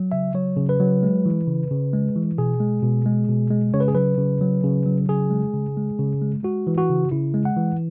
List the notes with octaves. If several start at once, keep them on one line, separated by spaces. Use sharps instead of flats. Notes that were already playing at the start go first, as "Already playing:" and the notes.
Already playing: F#3
C#3 E5
F#3 C#5
C#3
B4
F#3
G#3
E3
C#3
C#3
G#3
E3
B2 G#4
G#3
B2
G#3
B2
G#3
C#3 C#5
B4
G#4
F#3 B4
C#3
F#3
C#3
F#3
C#3 G#4
G#3
C#3
G#3
C#3
G#3
G#3 F#4
E3
F#4
C#3
C#3 E4
G#3
F#5
E3